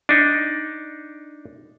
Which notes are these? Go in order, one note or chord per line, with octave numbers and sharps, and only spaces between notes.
D4 D#4